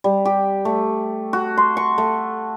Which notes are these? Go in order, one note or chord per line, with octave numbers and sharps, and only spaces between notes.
G3
G4
A3
F#4
C6
C#6
A3